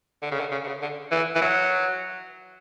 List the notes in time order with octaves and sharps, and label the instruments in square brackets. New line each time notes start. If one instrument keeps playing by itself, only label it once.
[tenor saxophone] D3
C#3
D3
C#3
D3
C#3
D3
E3
E3
F#3